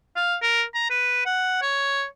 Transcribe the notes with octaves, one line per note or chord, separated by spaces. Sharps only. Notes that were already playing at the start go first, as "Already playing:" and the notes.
F5
A#4
A#5
B4
F#5
C#5